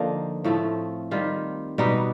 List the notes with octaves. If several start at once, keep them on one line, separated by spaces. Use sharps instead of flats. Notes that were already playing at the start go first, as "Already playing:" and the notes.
Already playing: D3 F3 A#3 D#4
A2 F3 A3 C4
D#3 G3 C4 F4
B2 G3 B3 D#4